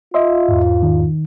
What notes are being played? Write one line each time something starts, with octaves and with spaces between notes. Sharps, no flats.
F4 D#5 E5 C6
E2 G#2
D#3